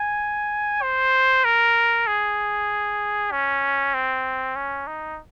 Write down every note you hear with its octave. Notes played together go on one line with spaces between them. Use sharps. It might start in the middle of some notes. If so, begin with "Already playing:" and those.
Already playing: G#5
C5
A#4
G#4
C#4
C4
C#4
D#4